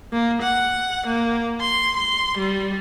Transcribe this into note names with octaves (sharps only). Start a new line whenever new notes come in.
A#3
F#5
A#3
C6
C6
G3